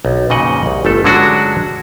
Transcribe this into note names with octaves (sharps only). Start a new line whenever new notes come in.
B1
F2 A#2 C#3 D#4 D#5 F#5
C2
G1 A3 A4
D3 F#3 G#3 C#4 D4 F#4